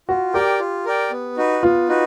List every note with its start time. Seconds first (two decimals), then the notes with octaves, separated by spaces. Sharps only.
0.09 F4 F#4
0.34 G4 A#4 D5 G5
0.60 F4
0.86 A#4 D5 G5
1.11 B3
1.37 D#4 F#4 B4
1.63 B3 F4
1.88 D#4 F#4 B4